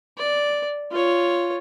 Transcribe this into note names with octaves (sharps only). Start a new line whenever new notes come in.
D5
F4 C#5